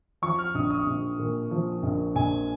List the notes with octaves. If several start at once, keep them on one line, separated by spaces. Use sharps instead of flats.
F3 C#6
F6
A#1 D#6
D#6
A#1
A#2
F3
A#1
A#1 G#5